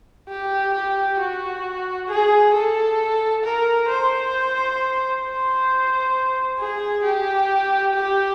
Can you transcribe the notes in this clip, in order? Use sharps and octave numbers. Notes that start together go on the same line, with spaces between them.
G4
G4
F#4
G#4
A4
A#4
C5
C5
G#4
G4
G4